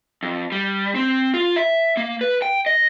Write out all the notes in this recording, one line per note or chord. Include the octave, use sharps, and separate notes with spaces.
F2
G3
C4
F4
E5
A#3
B4
G5
D#5